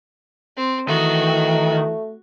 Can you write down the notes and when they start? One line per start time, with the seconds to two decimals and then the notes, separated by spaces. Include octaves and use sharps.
0.57 C4
0.88 D#3 E3 A3 F#4